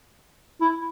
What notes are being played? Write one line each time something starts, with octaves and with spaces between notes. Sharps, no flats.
E4